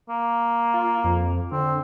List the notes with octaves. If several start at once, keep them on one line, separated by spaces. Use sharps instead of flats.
A#3
F4
F2
D3 C4